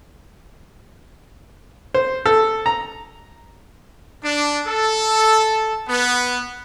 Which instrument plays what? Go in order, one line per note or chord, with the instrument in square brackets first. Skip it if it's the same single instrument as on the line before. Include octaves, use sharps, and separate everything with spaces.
[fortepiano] C5
A4
A#5
[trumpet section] D4
A4
B3